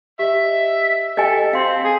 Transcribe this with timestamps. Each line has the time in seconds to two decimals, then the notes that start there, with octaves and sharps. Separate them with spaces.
0.19 G4 D#5 E5
1.17 G4 A4 D#5 G5 G#5
1.53 C4 F5 C6
1.84 G#4 G#5